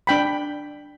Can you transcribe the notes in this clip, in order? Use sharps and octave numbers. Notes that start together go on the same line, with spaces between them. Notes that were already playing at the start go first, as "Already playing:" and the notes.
D4 G5 B5